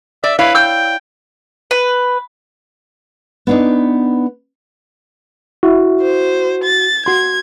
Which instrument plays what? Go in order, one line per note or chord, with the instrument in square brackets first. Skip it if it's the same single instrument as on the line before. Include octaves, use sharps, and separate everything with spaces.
[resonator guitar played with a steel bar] D5 [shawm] E5
[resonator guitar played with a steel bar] E4 C#5 F5 [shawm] B4
[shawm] G5 [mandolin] E6 G6
[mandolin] B4
[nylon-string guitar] B3 D4 D#4
[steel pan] E4 [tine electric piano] F#4
[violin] C5
A6
[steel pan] F#4 C6 [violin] G#6